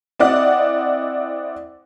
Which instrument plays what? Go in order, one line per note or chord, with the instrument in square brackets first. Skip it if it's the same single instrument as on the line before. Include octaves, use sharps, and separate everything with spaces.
[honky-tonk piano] C4 E4 D5 D#5 F#5